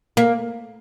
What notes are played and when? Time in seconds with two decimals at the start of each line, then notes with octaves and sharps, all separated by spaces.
0.17 A#3